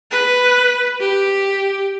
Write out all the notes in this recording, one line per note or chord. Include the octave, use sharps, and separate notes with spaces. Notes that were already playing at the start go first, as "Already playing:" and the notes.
B4
G4